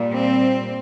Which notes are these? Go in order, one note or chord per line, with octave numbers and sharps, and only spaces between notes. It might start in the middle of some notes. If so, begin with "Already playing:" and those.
Already playing: A#2 G3
C4